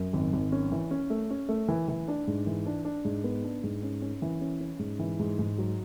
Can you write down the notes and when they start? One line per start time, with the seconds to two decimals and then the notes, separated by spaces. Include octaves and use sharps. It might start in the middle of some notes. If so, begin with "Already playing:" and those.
Already playing: F#2
0.13 G#1
0.33 G#1
0.52 C#4
0.72 E3
0.91 C#4
1.10 A3
1.30 C#4
1.49 A3
1.68 E3
1.88 E3
2.08 D4
2.27 G#2
2.47 E3
2.67 D4
2.85 D4
3.05 G#2
3.24 B3
3.44 D4
3.63 G#2
3.83 C#4
4.02 C#4
4.22 E3
4.41 C#4
4.60 C#4
4.79 G#2
4.99 E3
5.19 G#2
5.39 G#2
5.58 F#3